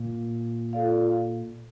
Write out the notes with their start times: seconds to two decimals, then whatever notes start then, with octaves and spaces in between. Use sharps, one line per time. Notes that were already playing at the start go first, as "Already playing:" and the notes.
Already playing: A#2
0.73 F4 A4 D5 F5